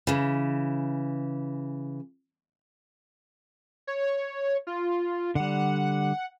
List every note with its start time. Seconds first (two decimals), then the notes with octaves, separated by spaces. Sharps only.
0.07 C#3 E3
3.87 C#5
4.67 F4
5.35 D3 G3 F#5